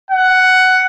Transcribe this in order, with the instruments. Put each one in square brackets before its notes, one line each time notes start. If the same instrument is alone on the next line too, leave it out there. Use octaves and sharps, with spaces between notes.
[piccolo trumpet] F#5